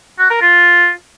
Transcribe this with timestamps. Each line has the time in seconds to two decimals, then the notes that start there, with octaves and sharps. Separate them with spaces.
0.19 F#4
0.30 A#4
0.41 F4